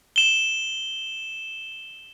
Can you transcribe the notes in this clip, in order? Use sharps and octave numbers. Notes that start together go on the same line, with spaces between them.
E7 G7